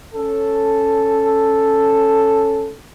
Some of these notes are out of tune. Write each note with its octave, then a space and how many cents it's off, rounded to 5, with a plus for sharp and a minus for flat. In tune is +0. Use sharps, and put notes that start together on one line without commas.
C#4 +0 A4 +0